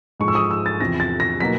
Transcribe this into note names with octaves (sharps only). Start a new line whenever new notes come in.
G#2 F3 G#3 C#6
E6
D#6
E6
A6
E2 C3 F3 A#6
A6
A#6
B2 F#3 A#3 D#4 B6